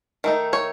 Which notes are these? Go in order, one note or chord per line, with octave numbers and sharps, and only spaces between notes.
D#3 A3 D#4
C#5